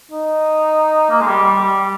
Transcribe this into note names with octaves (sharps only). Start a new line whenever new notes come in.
D#4
A#3
G#3
G3
G3
G3